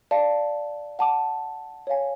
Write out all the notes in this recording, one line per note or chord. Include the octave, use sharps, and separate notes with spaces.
D5 F5 A5
F#5 A5 D6
C#5 F5 G#5